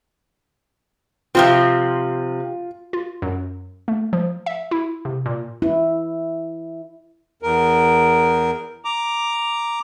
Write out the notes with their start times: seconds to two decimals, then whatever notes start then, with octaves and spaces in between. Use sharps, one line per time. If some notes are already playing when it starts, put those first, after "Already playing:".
1.35 C3 F3 C4 F4
2.93 F4
3.22 F#2
3.88 A3
4.13 F3
4.46 E5
4.71 E4
5.05 C3
5.26 A#2
5.62 E4
7.42 E2 A#4
8.85 A#5 D6